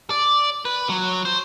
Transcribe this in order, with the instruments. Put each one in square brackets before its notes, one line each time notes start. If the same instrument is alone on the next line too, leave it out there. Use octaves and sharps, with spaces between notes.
[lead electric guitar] D5
B4
F#3
C5